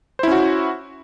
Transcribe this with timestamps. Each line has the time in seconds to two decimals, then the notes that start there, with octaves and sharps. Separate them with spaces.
0.19 C5
0.23 E4
0.27 C#4
0.32 F#4